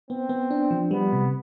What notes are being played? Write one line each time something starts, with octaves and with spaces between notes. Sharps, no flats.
B3 C4
B3
D4
F3
G3 B3
C3